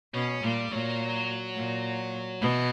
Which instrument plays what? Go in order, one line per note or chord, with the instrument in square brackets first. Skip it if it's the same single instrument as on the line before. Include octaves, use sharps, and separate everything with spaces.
[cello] B2 [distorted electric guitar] C#4
[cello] A#2 [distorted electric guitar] G3
[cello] A#2 [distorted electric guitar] F#3
[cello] A#2
[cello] B2 [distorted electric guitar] E3